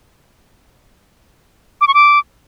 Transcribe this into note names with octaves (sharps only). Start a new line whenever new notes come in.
D6
C#6
D6